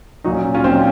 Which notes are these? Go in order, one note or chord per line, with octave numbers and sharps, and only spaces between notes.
A#2 F#3 D#4 F#4
C#4
C#4 F4
A#2 F#3 C4 D#4